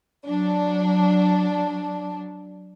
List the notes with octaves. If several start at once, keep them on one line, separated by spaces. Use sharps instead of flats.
F#3 D4